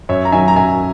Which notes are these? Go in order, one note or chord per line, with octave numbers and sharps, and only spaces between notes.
F#2 C#5 E5
A#5
D#3 F#3 E5 G#5
A#5
F#2 E5 G#5